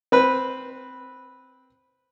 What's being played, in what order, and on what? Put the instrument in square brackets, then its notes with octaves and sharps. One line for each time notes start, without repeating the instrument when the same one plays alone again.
[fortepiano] C4 B4